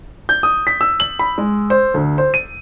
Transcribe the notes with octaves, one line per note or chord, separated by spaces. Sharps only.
G6
D#6
B6
E6
F#7
B5
G#3
C5
D2
C5
D#7